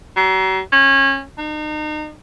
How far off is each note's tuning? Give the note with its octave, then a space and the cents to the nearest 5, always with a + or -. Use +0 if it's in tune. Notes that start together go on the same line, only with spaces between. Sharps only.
F#3 +40
C#4 -25
D#4 -35